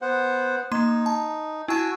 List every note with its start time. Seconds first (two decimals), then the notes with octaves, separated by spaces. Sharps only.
0.02 B3 C5 F#5
0.72 A#3 D#4 C6
1.06 A5
1.68 E4 F#4 G#5 A5 E6